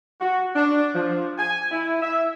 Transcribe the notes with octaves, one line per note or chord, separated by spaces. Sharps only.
F#4
D4
F3
G#5
E4
E5